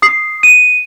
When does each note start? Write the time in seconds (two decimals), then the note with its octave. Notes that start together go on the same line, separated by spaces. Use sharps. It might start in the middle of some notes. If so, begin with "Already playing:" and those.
0.02 D#6 C7
0.43 D#7